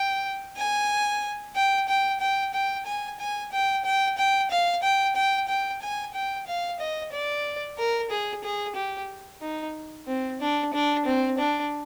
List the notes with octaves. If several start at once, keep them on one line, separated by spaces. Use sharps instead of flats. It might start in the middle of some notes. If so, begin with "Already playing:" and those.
Already playing: G5
G#5
G5
G5
G5
G5
G#5
G#5
G5
G5
G5
F5
G5
G5
G5
G#5
G5
F5
D#5
D5
A#4
G#4
G#4
G4
D#4
C4
D4
D4
C4
D4